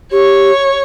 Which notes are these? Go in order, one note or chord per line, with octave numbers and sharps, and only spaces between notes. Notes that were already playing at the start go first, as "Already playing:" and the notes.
G4 C#5